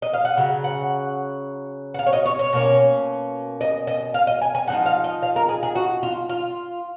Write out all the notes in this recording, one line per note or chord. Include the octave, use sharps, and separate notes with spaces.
D#5
F5
F#5
C#3 F#3
F#5
F#5
F5
C#5
D#5
C#5
C#5
B2 A#3 C#4
D#5
D#5
F5
D#5
G#5
G#5
F3 A#3 D#4 F#5
F5
D#5
F5
A#4
G#4
G#4
F#4
F4
F4